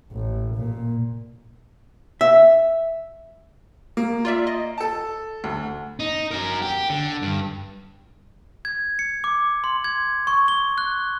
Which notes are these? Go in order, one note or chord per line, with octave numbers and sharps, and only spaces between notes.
A1
A#2
E5
A#3
F4 D5 E5
D#5
A4 A5
D2
D#4
F#4 A#4
G4
D3
G2
G#6
C#7
D6
C6
G#6
C#6
G7
F#6